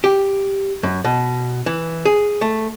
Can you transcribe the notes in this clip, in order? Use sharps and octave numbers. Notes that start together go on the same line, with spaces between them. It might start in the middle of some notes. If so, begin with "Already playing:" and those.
G4
F#2
B2
E3
G#4
A3